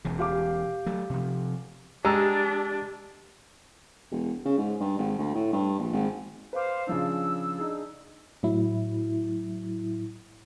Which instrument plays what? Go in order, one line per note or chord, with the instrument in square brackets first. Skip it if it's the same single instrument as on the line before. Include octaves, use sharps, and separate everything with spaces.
[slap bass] E1 E2 C#3
[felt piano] G4 F5 D6
[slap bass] F#3 A3
C3 F3
[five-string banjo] G#3 [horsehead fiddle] D4 [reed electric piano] G4 [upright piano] A#5 E6
[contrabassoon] E1
C#3
G#2
G2
G#1
D2
A2
G2
A#1
G#1
[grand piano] B4 D6 [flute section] C5 F5
[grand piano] C#3 F3 D4 [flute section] E6
[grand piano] D4 D#4 G#4
[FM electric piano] A2 F#3 E4